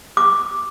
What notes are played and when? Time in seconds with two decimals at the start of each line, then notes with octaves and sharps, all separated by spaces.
0.17 D6